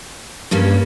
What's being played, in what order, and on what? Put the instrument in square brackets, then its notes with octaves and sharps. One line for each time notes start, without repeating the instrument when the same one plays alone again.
[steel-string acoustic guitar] G2 G3 A#3 C#4